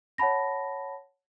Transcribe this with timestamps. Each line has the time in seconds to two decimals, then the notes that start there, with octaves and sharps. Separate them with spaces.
0.18 C#5 F#5 A5 B5 A#6